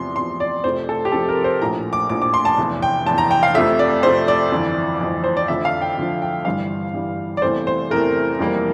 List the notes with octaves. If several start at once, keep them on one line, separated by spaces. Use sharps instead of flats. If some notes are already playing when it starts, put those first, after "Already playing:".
Already playing: E2 C3 F3 C6
E2 C3 F3 C6
D5
F2 C3 F3 A3 C5
A4
G4
F2 C3 F3 A3 A4
A#4
C5
A#1 A2 F3 A#5
D6
A#1 A2 F3 D6
D6
C6
A5
F1 E2 E3
G5
F1 E2 E3 A5
A#5
G5
F5
F2 C3 F3 A3 E5
D5
F2 C3 F3 A3 C5
D5
G1 F2 E3
G1 F2 E3
C5
D5
F2 D3 F3 E5
F5
G5
F2 D3 F3
G5
G1 G2 E3 G3 F5
G1 G2 E3 G3
D5
E2 C3 E3 A3 C5
C5
E2 C3 E3 A3 A#4
F2 C3 E3 G3 A#3